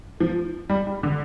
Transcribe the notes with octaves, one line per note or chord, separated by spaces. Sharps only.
F3
G3
G3
D3